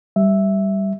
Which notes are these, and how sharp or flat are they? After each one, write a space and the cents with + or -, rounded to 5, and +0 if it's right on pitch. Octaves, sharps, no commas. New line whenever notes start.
G3 +0 E5 +0